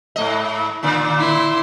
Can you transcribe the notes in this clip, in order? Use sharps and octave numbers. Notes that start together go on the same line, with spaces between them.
G#2 A3 D#5
A#2 D3 A#3
E4 C6